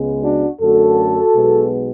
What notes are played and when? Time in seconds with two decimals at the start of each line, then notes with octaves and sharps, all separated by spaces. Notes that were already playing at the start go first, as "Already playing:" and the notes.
Already playing: C#2 C#3 G#3 B3
0.22 D4 F#4
0.60 F#2 D3 A3 F#4 A4
1.35 B1 B2 G#3